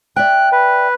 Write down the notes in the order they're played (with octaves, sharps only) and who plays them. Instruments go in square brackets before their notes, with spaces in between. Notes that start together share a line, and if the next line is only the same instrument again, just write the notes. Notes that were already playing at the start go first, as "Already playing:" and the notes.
[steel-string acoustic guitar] D5 E5 G5 [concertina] F#6
[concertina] B4